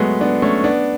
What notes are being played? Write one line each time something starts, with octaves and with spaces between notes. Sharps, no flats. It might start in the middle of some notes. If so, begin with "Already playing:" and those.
Already playing: F#3 G#3 A3 B3
B3 D4
A3 C#4
B3 D4